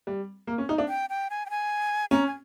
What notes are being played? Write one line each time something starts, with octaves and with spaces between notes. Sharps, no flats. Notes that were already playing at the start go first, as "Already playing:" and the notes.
G3
A#3
C#4
D#4
D4
G5
G5
G#5
G5
G#5
C#4 A#5
G#5